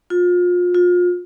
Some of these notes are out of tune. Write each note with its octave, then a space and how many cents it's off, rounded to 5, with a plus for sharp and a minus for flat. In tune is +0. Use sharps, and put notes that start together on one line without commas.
F4 +30
F4 +30